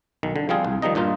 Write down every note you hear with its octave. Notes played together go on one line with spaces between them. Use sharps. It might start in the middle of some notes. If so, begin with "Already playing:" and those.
B1 D#3
D3
F3 G3 C4 F4 G#4
C2
D#3 F3 G3 D#4 D#5
G2 A#2 D#4 F4